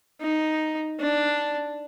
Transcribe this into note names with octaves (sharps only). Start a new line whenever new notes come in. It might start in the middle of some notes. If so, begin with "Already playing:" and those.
D#4
D4